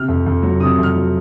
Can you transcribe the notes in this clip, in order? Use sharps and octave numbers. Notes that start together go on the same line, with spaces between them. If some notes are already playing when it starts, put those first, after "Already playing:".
Already playing: C3 F6
F2
F2
F#3
C3 D#6
F2
F6
F#3